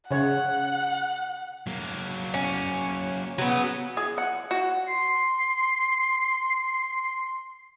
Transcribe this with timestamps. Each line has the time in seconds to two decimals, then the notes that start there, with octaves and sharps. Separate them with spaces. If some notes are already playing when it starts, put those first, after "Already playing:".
0.11 C#3 C#5 F#5
1.67 F#3 A#3
2.34 C#4
3.38 C#3 F#3 B3
3.97 G#4
4.18 F#5
4.51 F#4
4.87 C6 C7